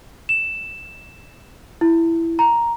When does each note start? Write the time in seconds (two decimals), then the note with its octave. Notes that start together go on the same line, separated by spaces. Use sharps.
0.29 E7
1.81 E4
2.39 A#5